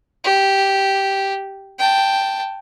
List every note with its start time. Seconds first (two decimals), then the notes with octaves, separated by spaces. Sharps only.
0.24 G4
1.79 G5 A5